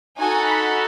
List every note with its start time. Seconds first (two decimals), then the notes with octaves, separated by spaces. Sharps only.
0.17 D#4 F#4 A4 G#5
0.46 B5